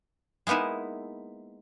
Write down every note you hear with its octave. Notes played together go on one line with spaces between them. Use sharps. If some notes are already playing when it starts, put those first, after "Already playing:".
G#3 A#3 B3 D#4 E4